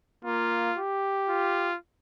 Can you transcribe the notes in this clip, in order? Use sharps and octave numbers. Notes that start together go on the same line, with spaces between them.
A#3 F4
G4
F4